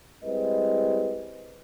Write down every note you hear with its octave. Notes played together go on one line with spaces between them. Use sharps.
G3 G#3 C4 E4 B4 D#5